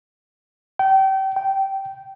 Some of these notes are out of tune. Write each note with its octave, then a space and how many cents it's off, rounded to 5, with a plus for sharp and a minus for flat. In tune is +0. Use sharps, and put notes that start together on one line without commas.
G5 -30
G5 -15